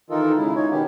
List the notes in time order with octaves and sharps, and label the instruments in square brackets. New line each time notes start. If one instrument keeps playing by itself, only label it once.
[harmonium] D#3 E3 D#4 F4 A4 A#4
C#3 G#3 E4
D#4 C#5
B2 D#3 B3 C#4 G4